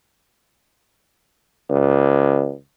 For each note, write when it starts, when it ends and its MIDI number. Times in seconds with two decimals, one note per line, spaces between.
1.70 2.53 37